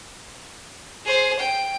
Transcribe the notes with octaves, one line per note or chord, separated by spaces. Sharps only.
G#4 C5
G5